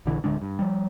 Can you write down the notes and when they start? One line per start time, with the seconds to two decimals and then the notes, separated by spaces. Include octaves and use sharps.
0.06 A#1 D3 E3
0.24 D1 D3 G#3 D4
0.42 G2
0.59 F3 G3